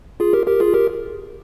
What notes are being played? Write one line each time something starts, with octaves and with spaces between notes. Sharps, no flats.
F4 G#4
G4 A#4
G4 A#4
F4 G#4
G4 A#4